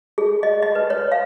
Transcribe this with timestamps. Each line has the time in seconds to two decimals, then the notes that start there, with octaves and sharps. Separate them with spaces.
0.18 G#4
0.43 D#5
0.62 D#5
0.75 B4
0.90 C#5
1.12 F5